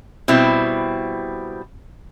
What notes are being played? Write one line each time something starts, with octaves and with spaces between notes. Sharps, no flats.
B2 G3 C4 E4